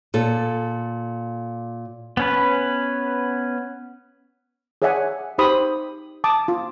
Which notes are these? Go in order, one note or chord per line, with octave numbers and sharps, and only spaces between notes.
A#2 A4
B3 C#4 B4
G#4 C#5 D5 E5 F#5 G#5
D#4 G4 C5 B5 D#6
A5 D6 D#6
F4